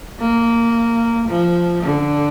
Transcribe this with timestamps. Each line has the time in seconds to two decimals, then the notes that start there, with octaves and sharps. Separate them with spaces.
0.20 A#3
1.29 F3
1.83 D3